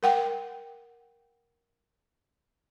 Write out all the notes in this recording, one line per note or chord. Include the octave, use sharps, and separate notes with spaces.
A#4 F#5 G5